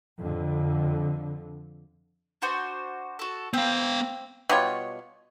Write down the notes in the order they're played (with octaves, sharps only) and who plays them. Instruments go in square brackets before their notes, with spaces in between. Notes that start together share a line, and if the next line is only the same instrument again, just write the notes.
[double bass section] F2 D3
[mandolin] D4 F#4 C5
F#4 A4
[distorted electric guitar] B3 F5 [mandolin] C4
[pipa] B2 G3 F4 C#5